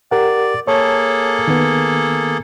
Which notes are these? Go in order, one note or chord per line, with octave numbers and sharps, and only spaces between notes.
G4 A#4 D5 F#5
A#3 G#4 A4 C#5 A5
D#3 B3